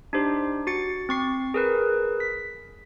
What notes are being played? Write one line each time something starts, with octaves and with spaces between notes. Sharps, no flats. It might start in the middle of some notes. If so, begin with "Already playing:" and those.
D4 D#4 G4 C5
F#4 A6 C#7
C4 C#6 C7
G#4 A#4 B4
B6